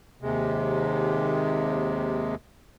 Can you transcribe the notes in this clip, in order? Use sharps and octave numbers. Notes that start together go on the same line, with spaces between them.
D#2 C3 G#3